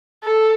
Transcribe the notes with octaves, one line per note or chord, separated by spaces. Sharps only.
A4